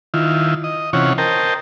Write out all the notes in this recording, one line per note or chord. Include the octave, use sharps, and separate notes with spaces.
D#3 E4 F4
D#5
C3 E3 C#4 F4 C#5 F#5
A#4 C5 D#5 G5 A5